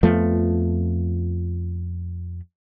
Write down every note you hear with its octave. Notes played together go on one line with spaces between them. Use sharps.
F2 F3 A3 B3